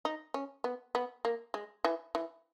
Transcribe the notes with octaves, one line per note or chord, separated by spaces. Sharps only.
D#4
C#4
B3
B3
A#3
G#3
E3
E3